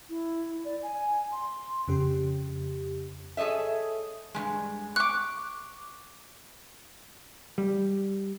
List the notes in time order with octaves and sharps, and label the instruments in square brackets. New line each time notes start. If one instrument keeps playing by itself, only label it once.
[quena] E4
D5
G#5
C6
[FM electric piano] F2 C#3 G4
[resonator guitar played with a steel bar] G#4 A4 C#5 D#5 E5
G2 C#3 G#3
[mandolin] C#6 D6 [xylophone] F#6
[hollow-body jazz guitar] G3